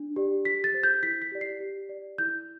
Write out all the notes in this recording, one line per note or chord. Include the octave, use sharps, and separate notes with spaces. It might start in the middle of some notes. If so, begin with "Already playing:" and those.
Already playing: D4
G4 D5
G4 B6
A6
C5
G6
E4 B6
B6
G4 D5
C7
G4
D5
E4 G6